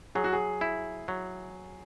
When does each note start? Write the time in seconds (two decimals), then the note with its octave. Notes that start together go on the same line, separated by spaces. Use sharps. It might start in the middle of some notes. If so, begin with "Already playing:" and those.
0.15 F#3 G#4
0.24 F#4
0.33 G#4
0.61 E4
1.08 F#3